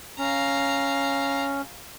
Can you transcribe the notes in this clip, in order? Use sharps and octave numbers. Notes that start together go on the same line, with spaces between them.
C#4 F5 A#5